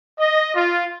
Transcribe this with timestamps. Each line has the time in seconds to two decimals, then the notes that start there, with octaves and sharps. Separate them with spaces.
0.19 D#5
0.55 F4